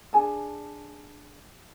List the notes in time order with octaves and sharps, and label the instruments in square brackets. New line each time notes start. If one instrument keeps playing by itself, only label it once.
[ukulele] D4 G#4 G#5 A5